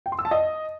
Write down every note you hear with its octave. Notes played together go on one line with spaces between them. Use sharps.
G5
C6
E6
A5
D#5